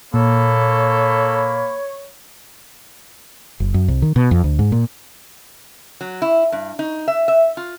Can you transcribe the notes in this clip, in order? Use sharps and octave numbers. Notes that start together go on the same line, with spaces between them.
A#2 A#3 A4 C#5 B5
F#1
F#2
C2
D#3
B2
F2
D2
G#2
A#2
F#3
E4
G2
D#4
E5
E5
F4